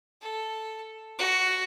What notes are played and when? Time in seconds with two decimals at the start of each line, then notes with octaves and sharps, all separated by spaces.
0.22 A4
1.19 F#4